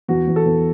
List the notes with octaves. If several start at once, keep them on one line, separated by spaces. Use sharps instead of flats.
E2 F#4
E2
A4
E2